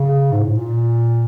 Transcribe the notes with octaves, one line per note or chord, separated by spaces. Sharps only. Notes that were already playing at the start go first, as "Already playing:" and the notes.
Already playing: C#3
G#2
A2
A#2